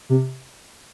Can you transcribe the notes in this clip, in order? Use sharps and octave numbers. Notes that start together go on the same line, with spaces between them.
C3